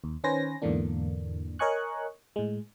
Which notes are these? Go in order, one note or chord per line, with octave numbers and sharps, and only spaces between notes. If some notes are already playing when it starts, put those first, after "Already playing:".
D#2
D#3 C#4 B4 C5 G#5 A#6
E2 G#2 D3 E3 A#3 D4
A#4 C#5 D#5 G#5 C#6 F#6
A2 G#3